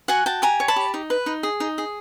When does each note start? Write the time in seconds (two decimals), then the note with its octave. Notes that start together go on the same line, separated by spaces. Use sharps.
0.08 F#4 F#5 G#5
0.26 F#4 G5 A5
0.42 G4 G#5 A#5
0.60 C#5
0.68 A5 B5
0.76 G4
0.94 D#4
1.10 B4
1.26 D#4
1.43 G#4
1.60 D#4
1.78 G#4